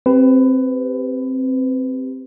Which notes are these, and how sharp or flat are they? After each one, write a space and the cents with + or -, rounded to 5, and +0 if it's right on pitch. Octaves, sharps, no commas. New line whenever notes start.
C4 +0 G4 +0 B4 +25